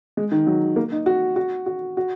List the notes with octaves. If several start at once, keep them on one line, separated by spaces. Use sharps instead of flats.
G#3
D#3
F#3
A#3
D#4
F#4
F#4
F#4
F#4